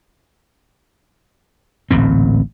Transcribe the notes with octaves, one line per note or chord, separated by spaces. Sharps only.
D1 A1 A#2 C4